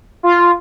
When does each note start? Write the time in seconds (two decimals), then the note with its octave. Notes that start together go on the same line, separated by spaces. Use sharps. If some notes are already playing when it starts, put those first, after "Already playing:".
0.23 F4